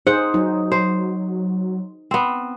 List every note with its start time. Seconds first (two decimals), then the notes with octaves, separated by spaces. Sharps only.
0.07 D#4 G#4 C5 F#5
0.34 F#3 D#4
0.72 C5
2.11 B3 C4